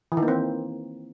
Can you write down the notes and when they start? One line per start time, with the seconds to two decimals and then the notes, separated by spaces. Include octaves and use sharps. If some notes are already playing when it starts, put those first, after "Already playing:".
0.12 E3
0.17 D#3
0.23 A#3
0.28 C4